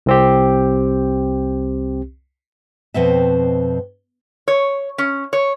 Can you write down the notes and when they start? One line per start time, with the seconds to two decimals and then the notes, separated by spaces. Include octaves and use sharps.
0.06 C2 C4 G4
2.94 F2 B2 C4 E5
4.48 C#5
4.98 C#4
5.33 C#5